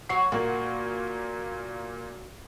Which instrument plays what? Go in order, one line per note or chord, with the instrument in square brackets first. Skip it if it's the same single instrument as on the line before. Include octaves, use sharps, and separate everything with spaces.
[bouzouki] F#3 F#4 C#5 [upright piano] C7
[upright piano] A#2 A#3 [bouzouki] F#4